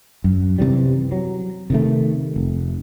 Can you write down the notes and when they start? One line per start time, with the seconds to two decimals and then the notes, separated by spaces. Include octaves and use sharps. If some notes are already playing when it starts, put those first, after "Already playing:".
0.24 F#2
0.58 C3 E3 G3
1.12 F#3
1.70 C3 D#3 A3
2.36 F1